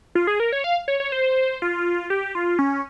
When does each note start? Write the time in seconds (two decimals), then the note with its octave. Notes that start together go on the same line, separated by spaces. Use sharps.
0.15 F4
0.27 G#4
0.40 A#4
0.52 C#5
0.64 F5
0.88 C#5
1.00 C#5
1.12 C5
1.62 F4
2.10 G4
2.35 F4
2.59 C#4